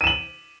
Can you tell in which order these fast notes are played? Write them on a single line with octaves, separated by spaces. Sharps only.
D#7 E7 F#7